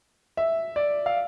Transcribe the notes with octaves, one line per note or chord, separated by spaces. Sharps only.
E5
D5
F5